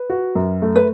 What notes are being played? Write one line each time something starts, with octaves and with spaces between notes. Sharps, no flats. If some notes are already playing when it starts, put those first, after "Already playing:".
Already playing: B4
F#4
F#2
A3
B4